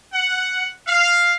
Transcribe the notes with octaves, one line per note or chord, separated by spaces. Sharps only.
F#5
F5